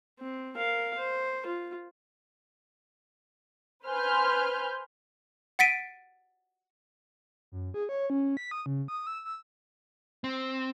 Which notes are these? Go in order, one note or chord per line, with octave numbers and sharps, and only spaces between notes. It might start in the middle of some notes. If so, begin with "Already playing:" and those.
C4
A#4 F5
C5
F4
B4 C5 G#5 C6 F6 G6
F#5 A6 B6 D7 D#7
F#2
G#4
C#5
C#4
B6
D#6
C#3
D#6
E6
E6
C4